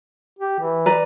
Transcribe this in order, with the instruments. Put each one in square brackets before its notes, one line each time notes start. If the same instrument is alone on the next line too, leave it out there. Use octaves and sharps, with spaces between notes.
[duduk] G4
E3
[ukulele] B4 D5 A#5